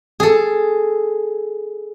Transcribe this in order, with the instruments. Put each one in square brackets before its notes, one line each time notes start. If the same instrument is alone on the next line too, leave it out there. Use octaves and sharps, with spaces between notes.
[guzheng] G#4 A4